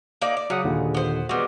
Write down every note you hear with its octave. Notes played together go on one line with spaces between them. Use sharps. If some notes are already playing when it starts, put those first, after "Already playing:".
A#3 D#4 D5
D5
C#3 F#3 F#5 D#6
D#2 A#2 D3
B3 C5
G3 G#3 B3 F#4